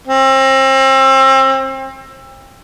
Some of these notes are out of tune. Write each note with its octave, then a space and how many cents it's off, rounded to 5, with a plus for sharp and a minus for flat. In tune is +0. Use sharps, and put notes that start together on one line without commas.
C4 +35